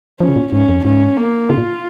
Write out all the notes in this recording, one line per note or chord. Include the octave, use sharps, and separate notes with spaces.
F3 C#4
C#3
A#2
G#2 C#4
F2
G#2 C#4
A#3
C#3 F4
A#2